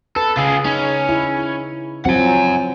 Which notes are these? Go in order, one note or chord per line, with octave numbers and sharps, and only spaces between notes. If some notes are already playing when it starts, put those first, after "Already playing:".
A4 B4
C#3 F4 G#4
C#4 D#4
E4
F3 F#3 C4 F#5 G#5